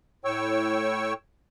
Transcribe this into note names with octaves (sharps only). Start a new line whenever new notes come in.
A2 C#5 G5 C#6 E6